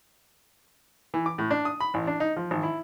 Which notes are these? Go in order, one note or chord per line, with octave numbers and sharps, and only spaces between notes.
E3
D6
A2
D4
D#6
B5
A1
D4
D#4
F3
G#1
E4